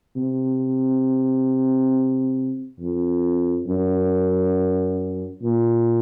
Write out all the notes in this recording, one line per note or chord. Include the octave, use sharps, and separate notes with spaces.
C3
F2
F#2
A#2